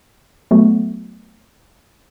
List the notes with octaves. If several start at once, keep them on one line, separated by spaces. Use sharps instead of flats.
F#3 A3 B3 F#4